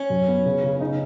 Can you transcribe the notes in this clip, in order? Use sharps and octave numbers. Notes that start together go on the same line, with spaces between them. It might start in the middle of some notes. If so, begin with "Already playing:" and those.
Already playing: C#4
F#2
B3
C#3
C#3
D#4